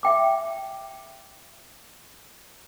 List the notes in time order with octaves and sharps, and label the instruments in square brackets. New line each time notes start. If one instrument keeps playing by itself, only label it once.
[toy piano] E5 G5 D6